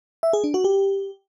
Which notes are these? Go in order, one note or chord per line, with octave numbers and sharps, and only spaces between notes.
E5
G#4
D4
F#4
G4